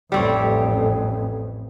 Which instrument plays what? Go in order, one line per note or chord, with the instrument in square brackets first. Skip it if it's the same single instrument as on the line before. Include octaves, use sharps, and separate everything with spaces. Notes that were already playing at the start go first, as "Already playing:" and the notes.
[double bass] A1 F2 [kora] G3 C4 C#5